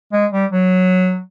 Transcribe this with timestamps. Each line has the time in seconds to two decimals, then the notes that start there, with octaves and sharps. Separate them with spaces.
0.13 G#3
0.32 G3
0.52 F#3